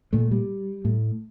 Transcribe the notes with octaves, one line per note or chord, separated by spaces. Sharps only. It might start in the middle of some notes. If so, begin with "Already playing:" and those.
A#2 A3
G3
A2